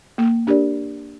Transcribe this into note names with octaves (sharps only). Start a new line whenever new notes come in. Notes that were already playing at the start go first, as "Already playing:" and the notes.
A#3
D4 G4 A#4 D5